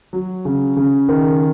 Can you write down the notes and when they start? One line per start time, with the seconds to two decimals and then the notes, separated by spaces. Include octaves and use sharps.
0.13 F#3
0.45 C#3
0.77 C#3
1.09 D#3